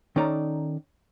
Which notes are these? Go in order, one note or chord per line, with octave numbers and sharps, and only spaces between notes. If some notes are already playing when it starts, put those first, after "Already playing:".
D#3 C#4 D#4 A4 D5 A#5